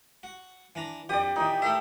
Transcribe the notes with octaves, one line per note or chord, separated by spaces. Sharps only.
F#4
E3 D4 A#5
A#1 F2 G4 D5 D#6
A#2 E3 D#4
A3 A4 A#4 E5